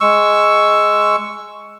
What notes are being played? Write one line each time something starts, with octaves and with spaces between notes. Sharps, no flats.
G#3 C#6 E6